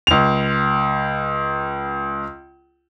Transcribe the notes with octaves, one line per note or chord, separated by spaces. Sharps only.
C#2 F7